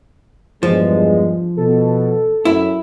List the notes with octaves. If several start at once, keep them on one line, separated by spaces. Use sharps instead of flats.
E2 G2 F3 G#3
B2 A4
F#2 E4